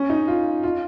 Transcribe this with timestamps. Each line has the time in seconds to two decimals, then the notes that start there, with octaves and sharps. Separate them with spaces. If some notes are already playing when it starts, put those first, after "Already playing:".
Already playing: C#4
0.10 D#4
0.28 F4
0.63 F4